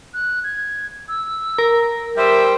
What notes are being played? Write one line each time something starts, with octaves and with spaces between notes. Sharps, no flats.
F#6
G#6
E6
A#4
G3 C5 E5 G5